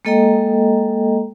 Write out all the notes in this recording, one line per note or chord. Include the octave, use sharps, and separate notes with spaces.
G#3 A#3 A4 D#5 G5 A#5